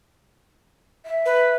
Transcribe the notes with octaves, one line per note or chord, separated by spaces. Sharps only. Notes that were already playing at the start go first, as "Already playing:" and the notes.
E5
B4